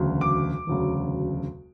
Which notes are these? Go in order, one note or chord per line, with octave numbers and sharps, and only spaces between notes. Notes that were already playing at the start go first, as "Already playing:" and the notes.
Already playing: E1 D2 C#3 F#3
D6
E1 D2 C#3 F#3